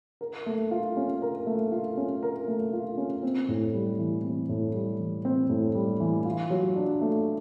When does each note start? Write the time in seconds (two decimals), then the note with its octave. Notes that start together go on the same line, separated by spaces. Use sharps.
0.21 A#4
0.46 A3
0.71 F4
0.97 C#4
1.22 A#4
1.47 A3
1.72 F4
1.97 C#4
2.23 A#4
2.48 A3
2.73 F4
2.98 C#4
3.23 C4
3.48 A2
3.74 G3
3.99 E3
4.24 C4
4.49 A2
4.74 G3
5.00 E3
5.25 C4
5.49 A2
5.75 G3
6.00 E3
6.25 F4
6.50 F#3
6.76 D4
7.01 A3